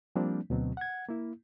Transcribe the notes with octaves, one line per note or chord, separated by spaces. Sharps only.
F3 G3 A#3 C4 D4
D2 B2 F#3 C4
F#5 G#6
A#3 E4